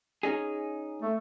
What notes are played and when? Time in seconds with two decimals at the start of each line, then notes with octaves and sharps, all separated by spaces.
0.23 C#4 D#4 G#4
1.02 A3